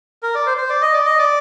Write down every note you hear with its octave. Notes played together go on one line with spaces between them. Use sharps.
A#4
D5
C5
C5
D5
D#5
D5
D#5
D5